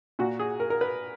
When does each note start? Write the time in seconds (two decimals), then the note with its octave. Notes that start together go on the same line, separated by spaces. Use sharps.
0.19 A#2 F#4
0.39 G#4
0.60 A#4
0.70 A#4
0.81 B4